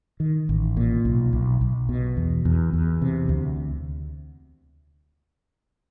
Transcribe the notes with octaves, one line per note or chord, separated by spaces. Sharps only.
D#3
A1
A#2
B1
B1
B1
B2
E2
E2
E2
C3
D2